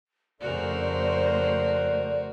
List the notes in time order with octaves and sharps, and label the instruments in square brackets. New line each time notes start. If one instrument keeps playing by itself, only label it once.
[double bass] F2 C#3 [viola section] A3 C5 [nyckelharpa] F#4 A#4 [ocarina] D5